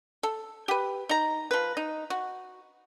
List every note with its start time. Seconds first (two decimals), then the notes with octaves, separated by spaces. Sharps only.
0.23 A4
0.68 G4 B4
1.09 D#4 A#5
1.51 F3 B4
1.77 D#4
2.10 F#4